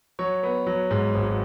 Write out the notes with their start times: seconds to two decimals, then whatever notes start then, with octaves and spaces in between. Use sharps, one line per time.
0.19 F#3 C#5
0.43 B3
0.66 F#3
0.91 G#2
1.14 G#1